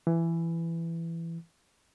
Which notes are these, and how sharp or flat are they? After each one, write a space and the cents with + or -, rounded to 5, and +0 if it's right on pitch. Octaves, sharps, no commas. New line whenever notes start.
E3 +15